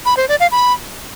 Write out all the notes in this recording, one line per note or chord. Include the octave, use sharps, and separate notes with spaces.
B5
C5
D5
F5
B5